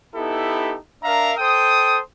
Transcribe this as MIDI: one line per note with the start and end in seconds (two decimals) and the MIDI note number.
0.16 0.77 59
0.16 0.77 63
0.16 0.77 64
0.16 0.77 67
0.16 0.77 69
1.04 1.34 62
1.04 1.34 70
1.04 1.34 76
1.04 1.34 77
1.04 1.34 82
1.38 2.00 69
1.38 2.00 72
1.38 2.00 79
1.38 2.00 87